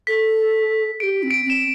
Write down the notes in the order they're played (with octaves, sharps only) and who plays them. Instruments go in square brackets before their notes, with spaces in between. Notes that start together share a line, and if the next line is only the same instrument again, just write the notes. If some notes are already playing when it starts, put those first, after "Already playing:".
[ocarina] A4 [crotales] B6
[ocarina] G4 A4 [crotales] D7
[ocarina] C4
[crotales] D7
[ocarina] C4 [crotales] E7